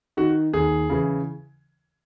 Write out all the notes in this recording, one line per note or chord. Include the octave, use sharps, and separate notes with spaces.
D#3 F#4
D#2 G#4
C#3 E3